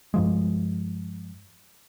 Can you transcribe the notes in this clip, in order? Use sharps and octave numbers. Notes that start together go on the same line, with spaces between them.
G2 F3 G#3